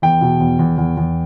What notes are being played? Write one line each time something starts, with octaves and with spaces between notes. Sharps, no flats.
E2 G5
B2
E2
E2
E2
E2